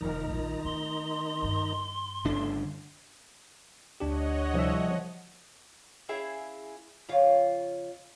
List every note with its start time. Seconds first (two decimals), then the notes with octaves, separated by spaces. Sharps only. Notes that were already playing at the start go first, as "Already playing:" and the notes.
0.01 F1 D#3 D#4 A#4 A#5
0.30 A#1 G3 F4
0.64 A3 C4 C6
1.42 G2 C4
2.25 G1 C#3 A3 D4
4.00 D2 D4 G4 C#5 D#5 F#5
4.54 C2 F3 E5
6.09 C#4 E4 G#4 E5 F5 G5
7.09 F2 C#3 F4 C#5 F5